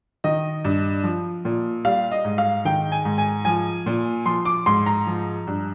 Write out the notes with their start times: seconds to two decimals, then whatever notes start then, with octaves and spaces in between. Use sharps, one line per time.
0.24 D#3 D#5
0.64 G2
1.04 F3
1.45 A#2
1.85 G3 F5
2.12 D#5
2.25 G#2
2.38 F5
2.65 D#3 G5
2.92 G#5
3.05 G#2
3.18 G#5
3.45 F3 G#5
3.86 A#2
4.26 F3 C6
4.45 D6
4.66 G#2 C6
4.86 A#5
5.07 F3
5.47 G2